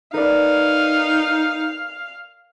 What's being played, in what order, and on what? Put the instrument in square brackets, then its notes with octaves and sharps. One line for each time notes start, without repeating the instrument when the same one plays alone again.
[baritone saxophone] D#4 [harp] A#4 B4 D5 [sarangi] F5